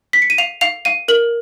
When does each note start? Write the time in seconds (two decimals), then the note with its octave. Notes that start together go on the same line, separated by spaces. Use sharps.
0.13 B6
0.22 C#7
0.30 D#7
0.38 F5 F7
0.61 F5 F7
0.85 F5 D#7
1.08 A#4 F#7